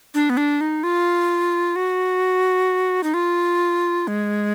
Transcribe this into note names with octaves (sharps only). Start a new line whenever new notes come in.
D4
B3
D4
D#4
F4
F#4
D#4
F4
G#3